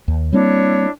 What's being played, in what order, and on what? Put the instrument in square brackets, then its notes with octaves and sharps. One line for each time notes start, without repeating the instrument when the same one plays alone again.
[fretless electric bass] D#2
[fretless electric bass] G3 A#3 C4 [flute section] D4 E4 C#5